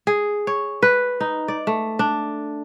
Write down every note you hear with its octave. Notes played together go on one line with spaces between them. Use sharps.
G#4
C#5
B4
D#4
D5
A3
D4